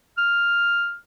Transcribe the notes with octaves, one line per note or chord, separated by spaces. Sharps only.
F6